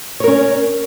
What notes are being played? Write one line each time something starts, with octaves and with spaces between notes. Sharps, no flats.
C#4 A#4 C#5